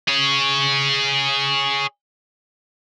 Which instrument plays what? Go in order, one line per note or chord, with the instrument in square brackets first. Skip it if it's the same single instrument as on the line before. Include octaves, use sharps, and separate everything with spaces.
[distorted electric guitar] G#4 C#5